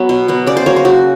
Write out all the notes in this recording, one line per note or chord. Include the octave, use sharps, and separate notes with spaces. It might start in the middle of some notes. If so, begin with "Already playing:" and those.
Already playing: F#3 B3
B2
F#3 B3
C#3 D5
C5
F#3 A#3 C#5
C5
C#3 F#4